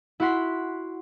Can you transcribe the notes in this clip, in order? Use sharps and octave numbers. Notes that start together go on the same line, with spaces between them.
E4 F#4 F#5 C6 B6